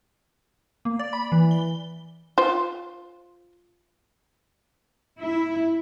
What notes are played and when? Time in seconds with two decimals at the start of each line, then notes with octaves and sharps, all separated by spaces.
0.85 A#3
0.99 D5
1.13 B5
1.32 E3
1.51 G7
2.38 F4 C5
5.20 E4